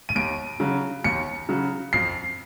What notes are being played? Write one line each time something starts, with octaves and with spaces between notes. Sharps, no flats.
D#7
D#2 D7
C#3 F#3
D#2 C#7
C#3 F#3
F2 C7